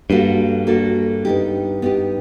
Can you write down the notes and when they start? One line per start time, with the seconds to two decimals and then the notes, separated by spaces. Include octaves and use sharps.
0.10 G2 A#3 D4 F#4 A4
0.67 A#3 D4 F#4 A4
1.25 B3 D#4 G4
1.82 B3 D#4 G4